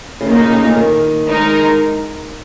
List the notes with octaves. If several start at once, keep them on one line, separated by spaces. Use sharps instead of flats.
C#3
A#2 D#3 A#3 D#4
C#3
C#3
A#2
D#3
G#3 D#4 A#4